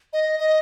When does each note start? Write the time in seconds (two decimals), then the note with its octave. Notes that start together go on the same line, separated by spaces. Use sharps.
0.13 D#5
0.40 D#5